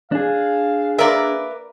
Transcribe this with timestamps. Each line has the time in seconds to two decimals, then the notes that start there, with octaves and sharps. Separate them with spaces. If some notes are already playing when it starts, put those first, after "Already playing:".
0.12 D4 G#4 F5
0.98 A#3 A#4 B4 D5 E5